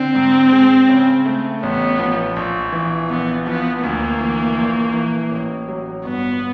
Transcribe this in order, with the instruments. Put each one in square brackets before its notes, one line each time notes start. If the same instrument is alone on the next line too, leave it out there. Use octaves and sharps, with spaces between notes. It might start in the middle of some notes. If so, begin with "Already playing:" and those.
Already playing: [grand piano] D3 [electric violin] C4
[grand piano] G#2
G#3
C#3
A3
[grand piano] A1 [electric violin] B3
[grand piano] F3
A#1
E3
[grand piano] A#1 [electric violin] B3
[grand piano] F3 [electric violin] B3
[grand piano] D2 [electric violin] A#3
[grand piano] E3
A#1
E3
A1
F#3
[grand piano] G1 [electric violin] B3